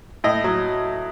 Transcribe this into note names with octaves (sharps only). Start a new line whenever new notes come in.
A2 D#5
F#3